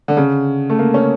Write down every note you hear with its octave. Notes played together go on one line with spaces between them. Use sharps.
D3
C#3
A3
A#3
C#4